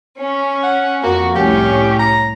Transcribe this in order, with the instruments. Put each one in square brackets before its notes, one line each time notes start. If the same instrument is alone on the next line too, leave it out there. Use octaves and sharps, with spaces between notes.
[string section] C#4
[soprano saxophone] F#5
[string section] F2 F#4 [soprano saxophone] A#3
[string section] C2 A2 C#4 [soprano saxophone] G4
[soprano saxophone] A#5